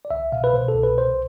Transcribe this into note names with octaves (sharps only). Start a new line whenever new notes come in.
D5
C2 E5
B2 F5
B4
B2 C5
A4
C2
B4
C2 C5